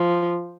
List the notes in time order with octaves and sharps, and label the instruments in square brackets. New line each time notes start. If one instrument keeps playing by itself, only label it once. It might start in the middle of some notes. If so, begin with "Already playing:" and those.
Already playing: [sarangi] F3